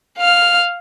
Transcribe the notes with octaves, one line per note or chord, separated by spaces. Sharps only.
F5 F6